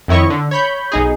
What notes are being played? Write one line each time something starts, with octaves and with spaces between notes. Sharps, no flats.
F2 D#3 E4 C#5 D#5 C#6
D3
C#5 B5 G6
B1 D#4 G#4